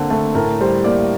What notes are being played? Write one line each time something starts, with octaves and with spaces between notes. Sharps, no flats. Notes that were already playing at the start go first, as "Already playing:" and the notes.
Already playing: D3 A#3 C4
A3
A2 A#4
G3 C5
A#3 D5